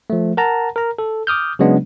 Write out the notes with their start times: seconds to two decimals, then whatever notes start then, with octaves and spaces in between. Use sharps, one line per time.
0.10 F3 A3
0.37 A#4 F#5 A5 A#5
0.76 A#4 A#5
0.98 A4
1.27 D6 D#6 F6 G6
1.59 C#3 F#3 G#3 B3 D4